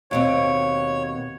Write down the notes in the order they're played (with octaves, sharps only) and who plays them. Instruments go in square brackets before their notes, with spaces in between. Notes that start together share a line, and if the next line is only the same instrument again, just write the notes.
[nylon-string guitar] D#2 B2 C4 [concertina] C#5